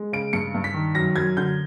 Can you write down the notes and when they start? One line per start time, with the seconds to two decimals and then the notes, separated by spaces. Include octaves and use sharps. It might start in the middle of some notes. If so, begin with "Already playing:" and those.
Already playing: G#3
0.13 C#3 D7
0.33 G2 C#7
0.54 G2
0.64 B6
0.74 D#3
0.95 F#2 A#6
1.16 F#2 G#6
1.37 D3 G6